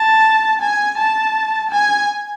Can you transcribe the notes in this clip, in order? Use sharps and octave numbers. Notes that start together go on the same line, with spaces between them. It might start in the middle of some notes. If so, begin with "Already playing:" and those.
Already playing: A5
G#5
A5
G#5